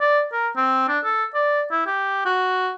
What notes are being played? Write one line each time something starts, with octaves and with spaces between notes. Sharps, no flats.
D5
A#4
C4
D4
A4
D5
E4
G4
F#4